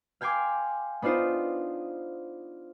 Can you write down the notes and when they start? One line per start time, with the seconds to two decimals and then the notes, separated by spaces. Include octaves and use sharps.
0.21 F5 G5 G#5 C6 D6
1.02 B3 D4 D#4 F4 C5